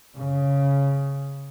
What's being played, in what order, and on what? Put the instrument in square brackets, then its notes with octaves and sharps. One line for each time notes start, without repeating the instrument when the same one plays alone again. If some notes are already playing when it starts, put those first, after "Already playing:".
[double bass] C#3